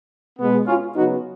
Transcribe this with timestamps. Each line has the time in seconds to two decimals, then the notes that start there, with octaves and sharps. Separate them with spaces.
0.38 B2 G#3 B3
0.67 C#4 F4
0.95 C#3 F#3 B3 D#4 F#4